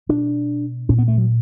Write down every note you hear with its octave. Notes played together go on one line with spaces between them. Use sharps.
B2 D4
A#2 C#4
B3
A3
F#3